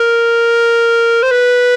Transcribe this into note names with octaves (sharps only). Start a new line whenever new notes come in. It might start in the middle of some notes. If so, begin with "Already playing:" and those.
Already playing: A#4
C5
B4